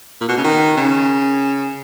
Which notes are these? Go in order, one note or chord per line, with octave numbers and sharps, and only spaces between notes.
A#2
B2
C#3
D#3
C#3